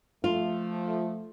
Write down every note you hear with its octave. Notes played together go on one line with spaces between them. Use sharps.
F3 A3 F4